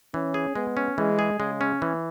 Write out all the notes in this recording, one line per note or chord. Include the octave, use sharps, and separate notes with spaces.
E3 C#4
G#4
G#3 B3
C#4
E3 G#3
G#4
C#3 G#3
C#4
E3